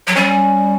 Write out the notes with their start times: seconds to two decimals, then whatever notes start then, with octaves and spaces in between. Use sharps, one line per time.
0.07 F#3
0.15 G3 C#4